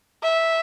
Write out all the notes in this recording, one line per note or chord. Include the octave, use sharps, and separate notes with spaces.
E5